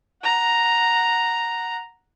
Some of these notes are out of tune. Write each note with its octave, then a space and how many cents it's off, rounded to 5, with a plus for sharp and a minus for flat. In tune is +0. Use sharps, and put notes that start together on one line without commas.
F#5 +0 A#5 +0